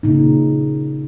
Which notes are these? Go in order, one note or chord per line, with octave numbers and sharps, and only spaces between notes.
A#2 C#3 D#4